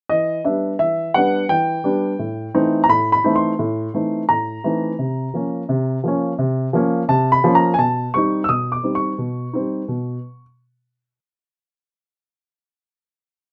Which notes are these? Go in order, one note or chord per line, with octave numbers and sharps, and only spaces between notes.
E3 D#5
G3 B3 D4 E5
E3 E5
G3 B3 D4 F#5
E3 G5
G3 B3 D4
A2
E3 A3 C4 D#4
A#5
A2 B5
B5
E3 A3 C4 D#4
C6
A2
E3 A3 C4 D#4
A2 A#5
E3 A3 C4 D#4
C3
F3 A#3 C#4
C3
F3 A#3 C#4
C3
F3 A#3 C#4
C3 A5
B5
F3 A#3 C#4
A#5
G#5
B2 A5
G3 C4 D#4 C#6
E6
B2 D#6
D6
G3 C4 D#4
C#6
B2
G3 C4 D#4
B2